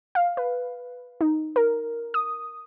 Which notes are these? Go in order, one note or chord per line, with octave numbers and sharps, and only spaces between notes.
F5
B4
D#4
A#4
D#6